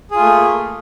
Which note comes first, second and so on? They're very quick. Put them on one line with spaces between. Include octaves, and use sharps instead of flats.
G#4 F4 A3 A#3